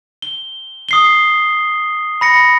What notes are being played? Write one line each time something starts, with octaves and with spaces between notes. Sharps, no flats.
G7
D#6 C7 G7
B5 A#6 C#7